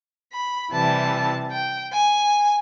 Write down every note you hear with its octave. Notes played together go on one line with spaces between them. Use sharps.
B5
C3 E3 G3 A5
G5
G#5